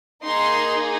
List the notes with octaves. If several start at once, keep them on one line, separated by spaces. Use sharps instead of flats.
A#3 D#4 G#4 C6